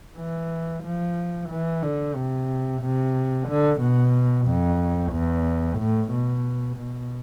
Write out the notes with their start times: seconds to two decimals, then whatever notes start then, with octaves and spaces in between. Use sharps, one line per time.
0.17 E3
0.84 F3
1.50 E3
1.83 D3
2.16 C3
2.82 C3
3.48 D3
3.81 B2
4.47 F2
5.12 E2
5.78 A2
6.12 B2
6.77 B2